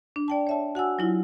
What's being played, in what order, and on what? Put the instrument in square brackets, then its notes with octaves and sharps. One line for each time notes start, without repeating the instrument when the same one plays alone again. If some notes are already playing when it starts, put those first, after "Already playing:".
[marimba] D4
D5 G5 A5
C#5 E5 A5
F#4 F#5 G#5 E6
F#3 E4 F4